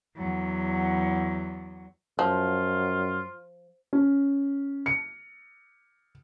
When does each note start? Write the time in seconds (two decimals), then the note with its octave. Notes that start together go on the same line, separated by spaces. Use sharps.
0.16 E2 F#3
2.19 F#2 F3 F4
3.93 C#4
4.86 C#7